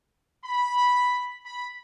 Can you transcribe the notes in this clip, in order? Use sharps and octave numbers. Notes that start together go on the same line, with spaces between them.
B5
B5